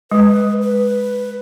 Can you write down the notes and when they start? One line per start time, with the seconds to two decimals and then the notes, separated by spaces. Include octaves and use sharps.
0.11 G#3 B4
0.61 B4